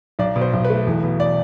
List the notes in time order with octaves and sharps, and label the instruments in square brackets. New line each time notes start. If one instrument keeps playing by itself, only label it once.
[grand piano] B1 D5
B2
C5
B1
B4
A3
E2
B2
D5